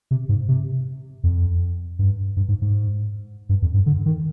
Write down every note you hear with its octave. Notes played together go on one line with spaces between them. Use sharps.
C3
G#2
C3
F2
G2
G2
G#2
G#2
G2
F2
G2
D3
D#3